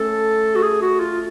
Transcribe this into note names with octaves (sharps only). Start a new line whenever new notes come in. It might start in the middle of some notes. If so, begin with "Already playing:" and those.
Already playing: A3 C#4 A4
F#4
G#4
F#4
F4